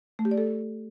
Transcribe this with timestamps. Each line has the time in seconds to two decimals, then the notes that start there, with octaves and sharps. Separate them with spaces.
0.19 A3
0.25 G4
0.31 D5
0.38 A4